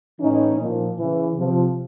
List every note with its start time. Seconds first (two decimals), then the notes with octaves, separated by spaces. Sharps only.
0.20 A2 E3 C#4 D#4
0.59 A#2 F3
0.97 C#3 E3
1.36 C3 F3